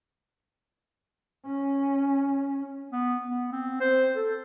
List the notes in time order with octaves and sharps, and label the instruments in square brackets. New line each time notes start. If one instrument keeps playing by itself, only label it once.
[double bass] C#4
[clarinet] B3
B3
C4
C5
A4